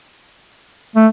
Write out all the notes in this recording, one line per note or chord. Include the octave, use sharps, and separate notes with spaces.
A3